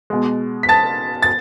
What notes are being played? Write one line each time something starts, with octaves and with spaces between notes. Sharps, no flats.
B2 G#3
B6
A5 A6
A6